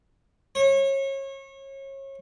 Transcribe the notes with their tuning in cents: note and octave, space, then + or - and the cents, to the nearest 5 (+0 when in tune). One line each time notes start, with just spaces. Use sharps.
C#5 -30